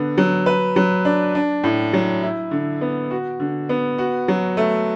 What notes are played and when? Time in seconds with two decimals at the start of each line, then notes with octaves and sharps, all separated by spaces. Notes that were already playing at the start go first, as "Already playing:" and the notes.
Already playing: D3 B3
0.18 F#3
0.46 B4
0.76 F#3
1.05 D4
1.35 D4
1.64 A2
1.93 F#3
2.23 E4
2.51 D3
2.81 B3
3.11 F#4
3.40 D3
3.69 B3
3.98 F#4
4.28 F#3
4.57 A3